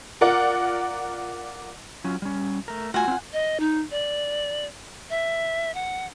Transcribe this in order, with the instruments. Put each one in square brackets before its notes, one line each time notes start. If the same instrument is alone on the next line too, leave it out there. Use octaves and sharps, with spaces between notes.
[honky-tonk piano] F4 A#4 D5 F#5
[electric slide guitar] F#3 C#4 F4
G3 C#4
A3 A#4
[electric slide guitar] A3 F4 F#4 [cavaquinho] F#5 G#5
[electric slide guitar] C4 D4 F4
[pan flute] D#5
D#4
D5
E5
F#5